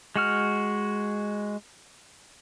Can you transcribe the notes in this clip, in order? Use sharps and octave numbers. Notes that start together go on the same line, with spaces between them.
G#3 F#4 F6